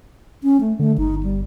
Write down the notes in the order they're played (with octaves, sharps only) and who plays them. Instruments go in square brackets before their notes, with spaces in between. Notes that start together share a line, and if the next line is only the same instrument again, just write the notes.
[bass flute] C#4
A3
[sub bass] D3 [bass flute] A3
[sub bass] G1 [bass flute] D#4
[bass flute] G3